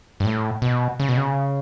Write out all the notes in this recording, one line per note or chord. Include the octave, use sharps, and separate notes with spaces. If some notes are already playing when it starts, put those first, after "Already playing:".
G2
A2
B2
C#3
B2
C#3